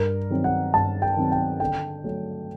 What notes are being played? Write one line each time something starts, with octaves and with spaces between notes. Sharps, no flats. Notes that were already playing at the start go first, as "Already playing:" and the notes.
Already playing: G2 A#4
D#3 F#3 C4
F#5
G2 A5
G5
D#3 F#3 C4
G5
D3 G5
F#3 A3